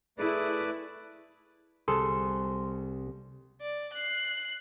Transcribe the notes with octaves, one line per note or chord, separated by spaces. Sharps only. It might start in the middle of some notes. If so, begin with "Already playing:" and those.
A3 E4 G#4 B4 D5
C2 G#4 A4 C6
D5
F#6 C7